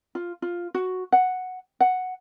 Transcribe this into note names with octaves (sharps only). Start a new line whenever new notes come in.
F4
F4
F#4
F#5
F#5